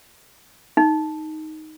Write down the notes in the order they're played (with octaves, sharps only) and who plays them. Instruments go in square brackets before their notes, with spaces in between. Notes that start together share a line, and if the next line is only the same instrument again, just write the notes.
[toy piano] D#4